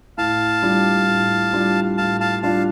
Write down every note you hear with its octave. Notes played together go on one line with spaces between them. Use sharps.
A2 F5 A5
G3 D4 F4
A2
G3 D4 F4
A2 F5 A5
F5 A5
G3 D4 F4 F5 A5